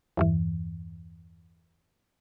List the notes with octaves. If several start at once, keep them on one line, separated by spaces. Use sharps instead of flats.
E2 G2 E3